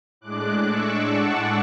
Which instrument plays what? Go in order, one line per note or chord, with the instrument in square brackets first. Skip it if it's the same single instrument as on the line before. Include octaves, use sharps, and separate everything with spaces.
[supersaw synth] A2 G#3 D4 D6 F#6
C#6 E6
F#5 A5